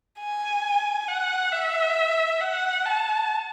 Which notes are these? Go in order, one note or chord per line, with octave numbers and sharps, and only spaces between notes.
G#5
F#5
E5
F#5
A5